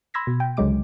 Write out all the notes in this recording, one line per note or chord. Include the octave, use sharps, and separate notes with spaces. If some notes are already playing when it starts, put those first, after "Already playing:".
B5 C6 E6 G#6 A#6 B6
B2
G5
C#2 D3 F#3 G#3 D6 D7